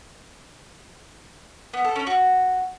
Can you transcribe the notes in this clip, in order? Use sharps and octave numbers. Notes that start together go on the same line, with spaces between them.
B3
A4
C#4
F#4